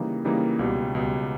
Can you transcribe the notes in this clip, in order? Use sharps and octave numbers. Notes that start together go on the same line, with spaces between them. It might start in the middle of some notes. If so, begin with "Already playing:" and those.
Already playing: C#3 E3 G3 A#3 D#4
C#3 E3 G3 A#3 D#4
C#2 B2 G3
C#2 B2 G3